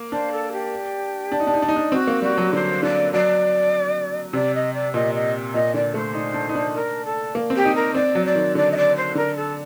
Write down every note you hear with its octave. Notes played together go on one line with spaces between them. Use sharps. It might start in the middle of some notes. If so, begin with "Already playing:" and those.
Already playing: A#3
D4 C5
A4
G4
D4
D#4
D4
D#4
D4
D#4
D4
C4 F#4
A#3
G3 F#4
F#3
D3 C5
D3 D5
F#3 D5
C3 D5
D#5
D5
A#2 D#5
D#5
A#2 D#5
D3 D5
A3 C5
D#4
D4
D#4
D4
A#4
A4
A#3
C4
G4
D#4
A#4
C4 D5
F#3
D5
D#3
D3 D5
D#5
D5
C5
D3 A#4
A4